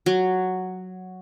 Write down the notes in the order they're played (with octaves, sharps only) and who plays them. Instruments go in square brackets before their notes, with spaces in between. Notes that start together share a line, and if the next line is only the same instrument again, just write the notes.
[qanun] F#3